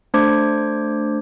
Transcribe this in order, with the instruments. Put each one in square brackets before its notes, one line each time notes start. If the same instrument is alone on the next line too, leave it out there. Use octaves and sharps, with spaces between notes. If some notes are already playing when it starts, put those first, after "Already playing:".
[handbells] A3 D4 C5 D6 G#6